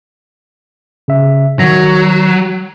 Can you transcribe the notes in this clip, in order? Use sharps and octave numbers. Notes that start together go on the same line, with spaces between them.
C#3 E5
D#3 F#3 A#6